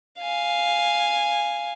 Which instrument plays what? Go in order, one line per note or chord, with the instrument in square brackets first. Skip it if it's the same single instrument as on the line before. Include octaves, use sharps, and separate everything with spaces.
[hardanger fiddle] F5 G#5